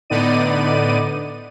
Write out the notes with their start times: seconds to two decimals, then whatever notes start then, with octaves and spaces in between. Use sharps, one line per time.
0.10 A2 D3 B3 D#4 D5 D#7